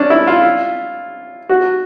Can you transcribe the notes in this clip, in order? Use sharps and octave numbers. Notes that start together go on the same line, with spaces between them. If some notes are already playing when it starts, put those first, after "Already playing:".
Already playing: C#4 D4
E4
F4
F#4